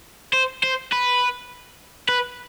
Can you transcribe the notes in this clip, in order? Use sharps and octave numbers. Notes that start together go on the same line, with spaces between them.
C5
C5
B4
B4